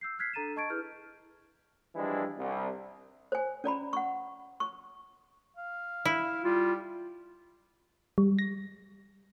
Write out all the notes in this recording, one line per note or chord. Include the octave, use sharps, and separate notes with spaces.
E6 G6 C7
F6 F#6 G#6 B6 C7
D4 A4 A#5 A6 D#7 E7
D#5 A5 C#6 G#6 A6 D7
E4 G#4 B4 F6 G6
E3 F3 G3 G#3 D4 E4
C2
C5 G#5
C#4 D5 A#5 B5
F#5 C#6
C#6
F5
E4
G3 F4
G3
A#6